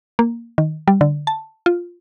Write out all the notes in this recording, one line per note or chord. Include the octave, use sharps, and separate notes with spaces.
A#3
D#3
G3
D3
A5
F4